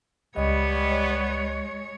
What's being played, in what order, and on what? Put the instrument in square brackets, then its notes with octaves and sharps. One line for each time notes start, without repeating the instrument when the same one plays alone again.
[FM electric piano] C#2 D#5 [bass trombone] G3 [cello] G#3 C#5 [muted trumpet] B3